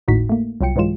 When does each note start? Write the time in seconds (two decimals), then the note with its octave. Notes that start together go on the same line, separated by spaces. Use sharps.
0.08 G#1 D#2 A2 D#4 F#4 B6
0.29 A3 A#3
0.61 C2 F#3 F4 G5 C#7
0.76 G#2 E3 F#3 G#3 F4 E7